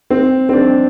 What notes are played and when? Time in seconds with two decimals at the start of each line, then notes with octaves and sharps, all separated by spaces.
0.10 C4
0.49 C4
0.53 D4